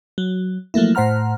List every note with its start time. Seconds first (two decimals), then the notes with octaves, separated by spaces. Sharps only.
0.18 F#3
0.74 F3 F#3 A3 A#3 E4
0.95 A2 C5 F#5 A#5 F6